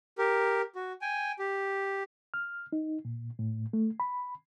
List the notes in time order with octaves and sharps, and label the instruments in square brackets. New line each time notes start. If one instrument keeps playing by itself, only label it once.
[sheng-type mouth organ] G4 A#4
F#4
G5 G#5
G4
[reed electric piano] F6
D#4
A#2
A2
A3
B5